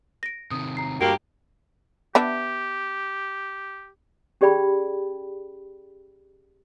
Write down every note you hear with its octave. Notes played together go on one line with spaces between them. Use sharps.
A#6 D7
C3 D#3 D#6
A#5 C7
D2 G2 A#3 G4 D7
B3 D4 G4 E5
C#4 G4 G#4 D5 G5 B5